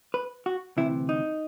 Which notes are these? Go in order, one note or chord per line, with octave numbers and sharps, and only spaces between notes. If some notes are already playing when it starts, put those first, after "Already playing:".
B4
F#4
D2 C3 E3 E4
D#4